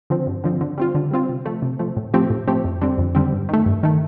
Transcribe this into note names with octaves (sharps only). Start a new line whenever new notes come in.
D3 F3 C4
G2
D3 F3 C4
D3
G3 C4 F4
D3
G3 C4 F4
C3
F3 A3
C3
F3 A3
A2
F3 A3 C4 G4
A2
F3 A3 C4 G4
F2
D3 G3 C4
F2
D3 G3 C4
G2
D#3 A3
G2
D#3 A3